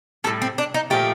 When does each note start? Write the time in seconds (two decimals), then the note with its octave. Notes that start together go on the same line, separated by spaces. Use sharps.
0.24 G3 A4
0.27 A2
0.42 C4
0.58 D4
0.74 D#4
0.90 A#2 F3 A3 G4